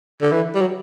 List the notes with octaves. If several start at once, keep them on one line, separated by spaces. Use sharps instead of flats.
D3
E3
G3
F#3